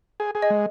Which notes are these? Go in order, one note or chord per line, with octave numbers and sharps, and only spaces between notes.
G#4
G#4
D#5
G#3